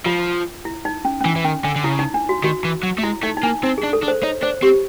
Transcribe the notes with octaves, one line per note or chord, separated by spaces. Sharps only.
F3 F4
E4
D#4
C#4
C#4
E3 D4
E3
D#3 C#4
D3 D4
D3
C#3 E4
D#4
D4
F#4
D#3 F#4
E3
F#3
A3
G#3 E4
A3 D#4
D#4
A#3 D4
C4 D#4
G#4
D4
A4
D4
C5
D#4 C#5
D4 C5
C4 G4